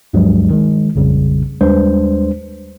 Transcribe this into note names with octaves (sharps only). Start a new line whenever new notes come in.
D2 G2 F3 F#3 G#3
D#3 G#3
A#1 F2 C#3 G3
D#2 G3 G#3 D4 B4 C5